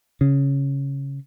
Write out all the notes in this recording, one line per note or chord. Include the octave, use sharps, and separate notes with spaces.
C#3